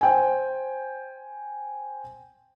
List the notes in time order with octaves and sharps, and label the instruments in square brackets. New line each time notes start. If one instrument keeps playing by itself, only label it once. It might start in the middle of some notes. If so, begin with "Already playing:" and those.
[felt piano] C5 G5 G#5